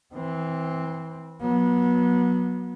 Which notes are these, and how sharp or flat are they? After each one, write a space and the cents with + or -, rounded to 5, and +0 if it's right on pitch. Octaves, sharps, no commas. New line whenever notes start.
E3 -20 C4 +0
F#3 -20 B3 -30